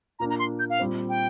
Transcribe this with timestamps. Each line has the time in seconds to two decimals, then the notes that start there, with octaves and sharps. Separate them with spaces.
0.19 A#2 A#3 D4 A#5
0.30 A#5
0.39 C6
0.59 G6
0.70 F5
0.79 A#2 G3 C4
1.09 G5